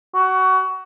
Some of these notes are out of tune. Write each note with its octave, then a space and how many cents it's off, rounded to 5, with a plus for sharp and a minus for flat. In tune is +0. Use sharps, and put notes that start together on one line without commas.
F#4 +20